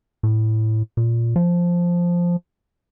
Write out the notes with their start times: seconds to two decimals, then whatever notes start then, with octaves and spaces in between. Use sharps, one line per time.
0.23 A2
0.97 A#2
1.36 F3